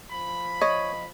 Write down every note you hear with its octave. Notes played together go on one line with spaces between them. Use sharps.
F3 B5
C#5 D#5